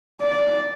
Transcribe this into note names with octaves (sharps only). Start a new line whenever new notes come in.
D5